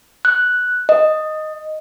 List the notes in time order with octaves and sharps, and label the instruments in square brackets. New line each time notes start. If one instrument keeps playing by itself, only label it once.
[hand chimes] F#6
D#5